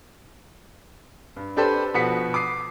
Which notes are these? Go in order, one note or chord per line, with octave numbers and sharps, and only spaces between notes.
G2
D4 G4 A4 B4 C5 D5
B2 F3 F#4 B6 C#7
D6 D#6 C7